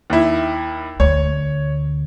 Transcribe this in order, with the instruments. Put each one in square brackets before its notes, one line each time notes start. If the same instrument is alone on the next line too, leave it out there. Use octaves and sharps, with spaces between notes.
[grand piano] D#2 E4
[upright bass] D2 [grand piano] C#5